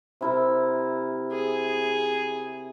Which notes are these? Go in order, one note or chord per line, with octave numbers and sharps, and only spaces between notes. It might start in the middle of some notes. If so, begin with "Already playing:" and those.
C3 E4 A#4
G#4